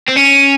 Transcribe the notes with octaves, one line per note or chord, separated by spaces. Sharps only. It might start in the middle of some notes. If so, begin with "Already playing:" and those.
C4
C#4